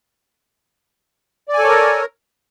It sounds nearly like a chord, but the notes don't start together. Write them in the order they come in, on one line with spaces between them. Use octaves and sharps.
D5 G#5 A4 C#5 A#4